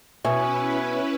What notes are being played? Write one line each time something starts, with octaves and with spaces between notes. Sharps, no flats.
B2 C#4 E4 B4 C#5 E5 G#5